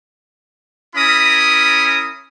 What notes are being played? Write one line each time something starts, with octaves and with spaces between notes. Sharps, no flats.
C#4 E4 A#4 B5 D#6